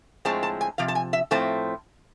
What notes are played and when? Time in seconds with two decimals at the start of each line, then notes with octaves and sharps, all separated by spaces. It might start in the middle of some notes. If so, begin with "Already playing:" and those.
0.25 A2 F3 G#3 C4 A5
0.43 A5
0.61 G#5
0.78 C3 F3 F5
0.88 A5
0.95 G#5
1.13 E5
1.31 A2 F3 A3 C4 A5